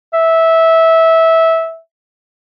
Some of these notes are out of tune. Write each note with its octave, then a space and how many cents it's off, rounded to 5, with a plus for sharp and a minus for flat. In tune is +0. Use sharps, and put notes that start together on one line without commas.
E5 -15